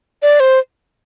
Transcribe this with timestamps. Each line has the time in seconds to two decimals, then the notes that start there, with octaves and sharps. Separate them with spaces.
0.22 D5
0.40 C5